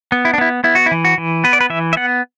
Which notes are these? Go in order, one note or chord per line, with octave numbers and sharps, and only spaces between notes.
B3
E4
D4
B3 E4
B3 E4
F#4
E4
E3
F#4
E3
B3 B4
D5
B4
E3 E5
E5
B3 F#5